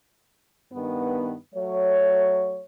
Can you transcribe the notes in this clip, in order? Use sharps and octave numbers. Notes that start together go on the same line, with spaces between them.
G2 D#3 B3
F#3 A3 C#5